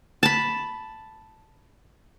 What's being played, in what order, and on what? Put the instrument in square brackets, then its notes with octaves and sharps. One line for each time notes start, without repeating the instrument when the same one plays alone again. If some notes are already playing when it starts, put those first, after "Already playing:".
[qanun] A5 B5